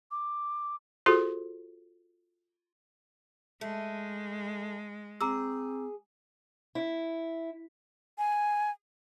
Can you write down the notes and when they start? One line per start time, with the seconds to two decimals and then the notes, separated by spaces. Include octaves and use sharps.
0.11 D6
1.06 F4 F#4 G#4 A4 C5
3.61 G#3 A3
5.21 C4 G#4 A#5 D6 E6
6.75 E4
8.18 G#5